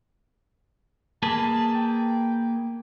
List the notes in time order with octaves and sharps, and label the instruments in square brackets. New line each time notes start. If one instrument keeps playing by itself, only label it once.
[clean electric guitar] A#3 G#4 B4 [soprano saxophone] A5
[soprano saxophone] G5